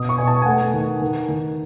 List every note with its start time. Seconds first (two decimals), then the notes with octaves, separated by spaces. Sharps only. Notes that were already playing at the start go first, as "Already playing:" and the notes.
Already playing: B2 D#6
0.09 C#6
0.18 B2 G#5
0.27 A5
0.42 G#5
0.46 A3 F#5
0.73 D#3
1.01 D#3
1.28 D#3